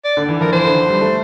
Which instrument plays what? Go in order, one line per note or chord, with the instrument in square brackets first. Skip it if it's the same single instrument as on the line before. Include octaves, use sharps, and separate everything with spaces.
[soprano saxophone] D5
[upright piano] D3
E3
[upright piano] F3 [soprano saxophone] A#4
[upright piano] E3 [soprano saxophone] C5
[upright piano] D3
E3
G3
A3